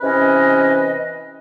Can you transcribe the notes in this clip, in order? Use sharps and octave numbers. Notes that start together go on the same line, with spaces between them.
C3 E3 C#4 B4 D#5